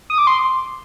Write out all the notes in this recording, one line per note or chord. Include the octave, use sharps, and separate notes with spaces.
D#6
D6
C6